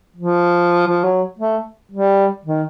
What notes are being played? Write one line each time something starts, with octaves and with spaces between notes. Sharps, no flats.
F3
F3
F#3
A3
G3
D#3